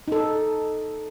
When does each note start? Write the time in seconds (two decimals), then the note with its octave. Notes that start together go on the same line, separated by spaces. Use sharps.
0.08 D#4 A4